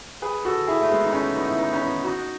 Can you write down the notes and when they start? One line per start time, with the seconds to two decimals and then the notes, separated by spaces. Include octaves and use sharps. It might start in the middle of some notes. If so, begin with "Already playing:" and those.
0.22 G#4 B4
0.45 F#4 A4
0.67 E4 G#4
0.81 A3
0.90 G#3 B3
1.06 D#4
1.13 A3 C#4
1.36 B3 D#4
1.47 E4
1.58 B3 D#4
1.73 C#4
1.81 B3 D#4
2.04 D#4 F#4